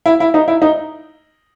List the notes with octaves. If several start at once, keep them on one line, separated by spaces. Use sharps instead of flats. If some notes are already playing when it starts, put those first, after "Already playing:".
E4
E4
D#4
E4
D#4